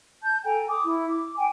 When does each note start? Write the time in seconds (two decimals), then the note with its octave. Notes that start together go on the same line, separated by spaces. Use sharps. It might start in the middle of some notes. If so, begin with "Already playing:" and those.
0.22 A5 G6
0.44 A4 G5 G#5 A#5
0.68 D6 D#6
0.84 E4
1.09 D6
1.37 G5 G#5